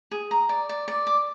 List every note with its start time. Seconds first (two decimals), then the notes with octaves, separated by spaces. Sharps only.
0.11 G#4
0.31 A#5
0.49 D5
0.69 D5
0.88 D5
1.07 D6